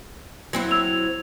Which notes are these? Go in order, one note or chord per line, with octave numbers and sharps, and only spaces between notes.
F#3 C4 E4
E6 G#6 F7